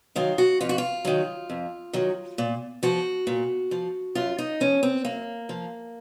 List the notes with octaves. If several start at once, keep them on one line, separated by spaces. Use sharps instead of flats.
D#3 F#3 F4
F#4
F2 F4
F#4
F4
D#3 F#3
F2
D#3 F#3
A#2
F3 F#4
A#2
F3
F#2 F4
D#4
F3 C#4
C4
F#2 A#3
F3